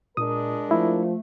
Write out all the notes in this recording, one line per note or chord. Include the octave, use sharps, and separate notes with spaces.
A#2 G#3 D4 A#4 D#6
F3 A3 E4